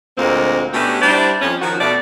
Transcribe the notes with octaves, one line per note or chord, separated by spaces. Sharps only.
D2 A#2 G#3 A#3 C4
B2 A3 C#4 D4 G4
G3 D4 E4 G4 C5 D5
F2 C#4
D#3 F3 F#4
B2 A3 D5